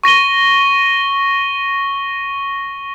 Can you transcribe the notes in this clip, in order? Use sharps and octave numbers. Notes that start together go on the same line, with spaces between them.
C#6 A#6 D#7 G7